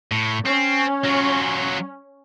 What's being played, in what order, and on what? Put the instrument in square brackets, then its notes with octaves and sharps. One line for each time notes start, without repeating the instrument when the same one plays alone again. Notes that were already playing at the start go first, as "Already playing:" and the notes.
[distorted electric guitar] A2
[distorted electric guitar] C4 [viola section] C#4
[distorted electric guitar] F#3 F4